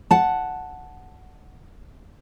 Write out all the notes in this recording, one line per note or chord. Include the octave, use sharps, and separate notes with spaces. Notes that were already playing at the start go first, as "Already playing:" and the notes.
F#5 A5